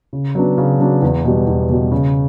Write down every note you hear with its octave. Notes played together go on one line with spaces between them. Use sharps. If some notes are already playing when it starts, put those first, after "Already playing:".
C#3
F#3 B3 D4
C#3
F#3 B3 D4
E2
B2 G3
E2
B2 G3
C#3